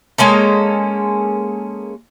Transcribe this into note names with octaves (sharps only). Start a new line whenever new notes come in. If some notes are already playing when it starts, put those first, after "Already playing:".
G#3 A#3 C#4 A4